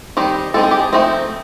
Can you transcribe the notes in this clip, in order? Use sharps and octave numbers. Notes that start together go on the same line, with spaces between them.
D#3 G3 C4 D#4
G#3 C4 D#4 A4
G#4
G4
G#4
F3 A3 C4 D#4